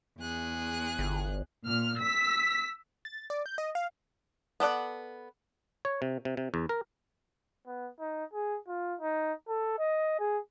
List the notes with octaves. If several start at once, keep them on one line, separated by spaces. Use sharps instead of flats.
E2 G#4 F#6
G1
A#2 F6
E6 B6
A6
D5
G6
D#5
F5
B3 A4 D5 F#5
C#5
C3
C3
C3
E2
A#4
B3
D#4
G#4
F4
D#4
A4
D#5
G#4